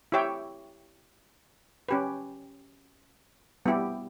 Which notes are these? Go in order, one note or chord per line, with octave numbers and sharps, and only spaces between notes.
E4 G4 C#5 E5 G5
C#4 G4 B4
G3 B3 E4 G4